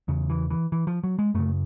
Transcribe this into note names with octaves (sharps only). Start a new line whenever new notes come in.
E2 C#3
E3
E3
E3
F3
F#3
G#3
F#2 C#3 A3